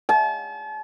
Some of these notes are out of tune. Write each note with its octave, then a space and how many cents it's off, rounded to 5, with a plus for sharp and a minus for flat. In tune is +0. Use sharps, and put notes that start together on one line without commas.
A5 -40